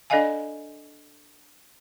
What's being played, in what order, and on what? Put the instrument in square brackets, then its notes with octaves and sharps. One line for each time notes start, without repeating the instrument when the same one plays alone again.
[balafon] D4 A4 D5 D#5 F5 G#5